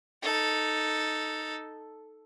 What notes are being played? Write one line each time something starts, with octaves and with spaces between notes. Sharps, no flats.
D#4 A4